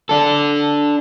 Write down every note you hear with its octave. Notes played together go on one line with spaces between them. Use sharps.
D4 A4